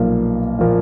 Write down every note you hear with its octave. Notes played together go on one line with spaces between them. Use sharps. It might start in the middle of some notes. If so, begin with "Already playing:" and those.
Already playing: B1 A#2 F3 A#3
A#2 F3 A#3